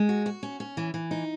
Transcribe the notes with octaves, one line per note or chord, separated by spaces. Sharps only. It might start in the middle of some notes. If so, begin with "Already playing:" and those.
Already playing: G#3
F#4
F#4
C#4
C#4
E3
E3
D#4